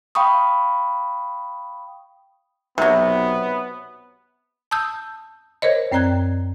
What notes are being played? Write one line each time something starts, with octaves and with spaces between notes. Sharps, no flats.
F5 G5 B5 C#6 D#6
B1 C3 F#3 B3
A5 D#6 E6 G6
A#4 C5 C#5 D#5
F#2 C4 D5 A#5 F#6 G#6